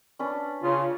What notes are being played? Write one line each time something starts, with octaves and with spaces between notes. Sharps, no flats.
C#4 D4 B4
C#3 F4